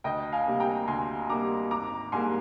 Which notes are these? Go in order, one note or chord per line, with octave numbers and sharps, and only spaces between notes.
D2 D#5 G5
F5 G#5
C3 G3 A#3
G5 A#5
D2 G#5 C6
C3 G3 A#3 A#5 D6
G#1 A#5 D6
G#2 G3 A#3 G#5 C6